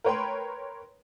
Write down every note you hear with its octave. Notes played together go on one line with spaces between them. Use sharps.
A#4 B4 C#5 G5 B5 C6